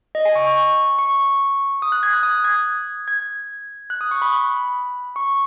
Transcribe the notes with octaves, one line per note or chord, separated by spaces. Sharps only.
D#5
G#5
C#6
C#6
C#6
D#6
F#6
G#6
F#6
D#6
G#6
G#6
F#6
D#6
C#6
B5
B5
C#6